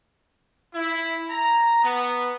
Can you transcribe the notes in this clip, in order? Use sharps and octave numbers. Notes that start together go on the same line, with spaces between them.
E4
A#5
B3